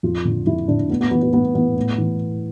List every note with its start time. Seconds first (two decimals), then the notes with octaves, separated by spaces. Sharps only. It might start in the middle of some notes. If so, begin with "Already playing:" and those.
0.03 F2 F4
0.25 D3
0.46 F2 E4
0.68 D3 D4
0.90 A2 B3
1.01 B3
1.11 E3 B3
1.23 B3
1.33 A2 B3
1.55 E3 B3
1.77 A2
1.98 E3